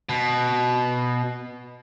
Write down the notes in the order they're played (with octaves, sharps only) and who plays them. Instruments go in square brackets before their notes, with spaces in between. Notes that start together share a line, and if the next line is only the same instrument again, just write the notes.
[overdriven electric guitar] B2